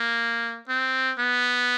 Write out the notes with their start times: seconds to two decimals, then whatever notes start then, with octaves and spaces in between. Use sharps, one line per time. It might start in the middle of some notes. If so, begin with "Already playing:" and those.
Already playing: A#3
0.69 C4
1.18 B3